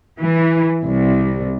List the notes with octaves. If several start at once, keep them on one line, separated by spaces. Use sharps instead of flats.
E3
C2